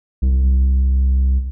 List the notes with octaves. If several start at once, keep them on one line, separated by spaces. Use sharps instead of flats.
C2